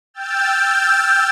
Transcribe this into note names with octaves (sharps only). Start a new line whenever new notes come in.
G5 E6 F6 G6 A6